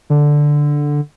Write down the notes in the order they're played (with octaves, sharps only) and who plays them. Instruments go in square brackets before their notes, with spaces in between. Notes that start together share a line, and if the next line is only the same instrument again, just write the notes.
[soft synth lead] D3